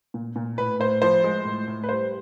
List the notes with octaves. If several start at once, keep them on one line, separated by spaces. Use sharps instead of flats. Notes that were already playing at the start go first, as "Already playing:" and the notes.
A#2
A#2
A2 B4
A2 C5
F3 C5
G#3
A2
A2
B4
G3 C5